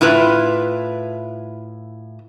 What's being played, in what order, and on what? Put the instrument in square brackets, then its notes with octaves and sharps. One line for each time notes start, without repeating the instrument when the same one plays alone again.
[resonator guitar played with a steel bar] A2 E4 F4 B4